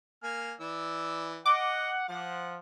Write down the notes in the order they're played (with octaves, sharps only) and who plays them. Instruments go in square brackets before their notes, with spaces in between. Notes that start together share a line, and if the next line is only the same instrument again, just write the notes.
[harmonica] A#3 G#5 F6
E3 D5 E6
[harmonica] D#5 [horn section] F#5 [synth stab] D6
[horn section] F3 [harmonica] F#5